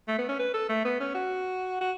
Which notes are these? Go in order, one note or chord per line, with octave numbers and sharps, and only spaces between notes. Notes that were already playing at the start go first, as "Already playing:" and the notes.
A3
B3
C#4
B4
A4
A3
B3
C#4
F#4
F#4